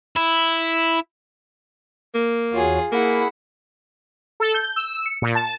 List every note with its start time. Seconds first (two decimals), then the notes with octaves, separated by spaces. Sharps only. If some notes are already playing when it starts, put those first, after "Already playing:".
0.16 E4
2.15 A#3
2.53 E2 F4 F#4 G#4 C#5
2.92 A#3 E4 G#4 F#5 B5
4.40 A4
4.54 G6
4.76 E6
5.06 C#7
5.22 A#2
5.35 A5